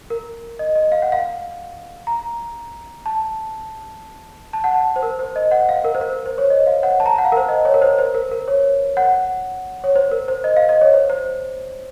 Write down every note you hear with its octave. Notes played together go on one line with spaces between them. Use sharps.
A#4
D#5
D#5
F5
F#5
F5
A#5
A5
A5
F#5
A5
C5
A#4
C5
D#5
F#5
F5
A#4
C5
A#4
A#4
C5
C#5
D#5
F5
F#5
A5
A#5
A5
F#5
F5
A#4
C5
D#5
C#5
A#4
C5
C5
A#4
A#4
C#5
F#5
C#5
C5
A#4
C5
D#5
F5
D#5
C#5
C5
C5